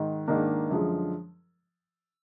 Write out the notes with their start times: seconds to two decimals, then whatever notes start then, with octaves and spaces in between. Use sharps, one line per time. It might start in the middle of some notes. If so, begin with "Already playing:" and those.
Already playing: G#2 D#3
0.27 G#2 D#3 A#3 D4
0.71 F#2 D3 F3 G#3